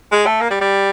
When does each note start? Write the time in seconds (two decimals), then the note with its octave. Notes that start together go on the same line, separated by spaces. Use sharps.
0.12 G#3
0.26 A3
0.41 A#3
0.50 G3
0.61 G3